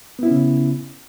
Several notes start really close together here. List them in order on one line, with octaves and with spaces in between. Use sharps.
B3 E4 C#4 C#3